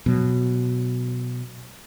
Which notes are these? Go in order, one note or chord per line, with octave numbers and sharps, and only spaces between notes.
B2 F#3